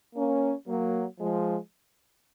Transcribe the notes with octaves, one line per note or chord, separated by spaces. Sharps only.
A#3 C#4
F#3 A#3
F3 G#3